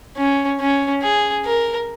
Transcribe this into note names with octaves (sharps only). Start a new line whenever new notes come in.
C#4
C#4
G#4
A#4